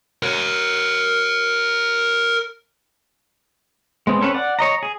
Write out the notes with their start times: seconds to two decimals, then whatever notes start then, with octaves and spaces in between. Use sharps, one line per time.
0.23 A#4 C#5
4.07 G#3 B3 C4
4.21 C4 C#4 A4 B4 C#5
4.34 D5 F#5
4.59 C#5 D#5 A#5
4.83 G#4